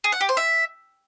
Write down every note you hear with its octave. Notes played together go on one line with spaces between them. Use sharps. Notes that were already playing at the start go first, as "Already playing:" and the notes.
G#4
F#5
G4
C5
E5